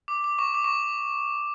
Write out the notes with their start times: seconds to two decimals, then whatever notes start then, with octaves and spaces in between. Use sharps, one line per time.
0.08 D6
0.24 D6
0.39 C#6
0.54 D6
0.64 C#6